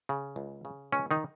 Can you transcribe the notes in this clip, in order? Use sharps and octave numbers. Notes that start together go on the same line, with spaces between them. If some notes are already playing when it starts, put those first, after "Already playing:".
C#3
C#2
C#3
C#2 C#4
D#3 D#4